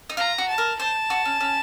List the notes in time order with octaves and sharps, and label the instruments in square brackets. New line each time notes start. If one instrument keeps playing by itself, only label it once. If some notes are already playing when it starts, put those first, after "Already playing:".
[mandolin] D#4
[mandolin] F4 [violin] A#5
[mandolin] F#4
[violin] A5
[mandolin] A#4
[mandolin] C5 [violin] A5
[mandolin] F#4
C#4
C#4